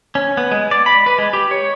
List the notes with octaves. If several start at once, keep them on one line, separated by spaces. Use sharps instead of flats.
C#4
B3
G#3
D5
B5
B4
G#3
G4
C#5